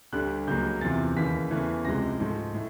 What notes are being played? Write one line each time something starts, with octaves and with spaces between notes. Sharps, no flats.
D2 D3 G3 F#6
C#2 C#3 F#3 A#3 G6
E2 C3 F3 A6
D#2 C#3 E3 B6
E2 C#3 E3 A3
C#2 C3 F3 G#3 A#6
G#2 F3 A3
A2